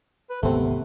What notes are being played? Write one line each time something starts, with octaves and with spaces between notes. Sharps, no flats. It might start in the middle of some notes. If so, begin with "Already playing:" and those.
B4
G#1 D2 C3 A3 B3 C4